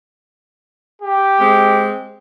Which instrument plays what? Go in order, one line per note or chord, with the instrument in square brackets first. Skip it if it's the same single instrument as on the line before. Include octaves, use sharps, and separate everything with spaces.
[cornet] G4
[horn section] G#3 C4